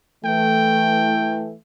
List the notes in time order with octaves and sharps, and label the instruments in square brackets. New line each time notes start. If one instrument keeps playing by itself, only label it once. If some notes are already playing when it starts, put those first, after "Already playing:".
[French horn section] E3 A3 [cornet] G5